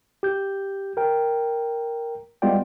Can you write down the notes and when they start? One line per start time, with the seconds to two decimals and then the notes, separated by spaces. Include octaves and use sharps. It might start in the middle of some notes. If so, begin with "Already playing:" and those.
0.23 G4 G6
0.97 A#4 G5
2.42 G3 G#3 B3 F4 D5 G5